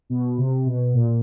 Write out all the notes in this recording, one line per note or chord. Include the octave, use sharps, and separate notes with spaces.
B2
C3
B2
A#2